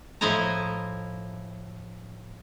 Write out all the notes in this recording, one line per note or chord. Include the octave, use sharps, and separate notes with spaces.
A2 F3 E4 D#5 G#5 A#5